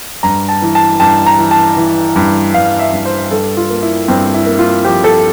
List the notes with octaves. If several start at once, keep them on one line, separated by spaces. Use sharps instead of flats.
G2 A#5
A5
E3
A5
G2 A5
A#5
E3
A5
E3
G2
G2 F5
E5
G2
C5
G2 A4
F4
A#3
E4
G2 C4
E4
A#3
F4
F3 G4
A4